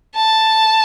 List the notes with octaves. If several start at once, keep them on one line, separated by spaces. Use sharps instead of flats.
A5